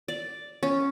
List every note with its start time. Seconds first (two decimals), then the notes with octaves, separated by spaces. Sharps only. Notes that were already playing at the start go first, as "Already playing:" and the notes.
0.08 D5
0.63 C#4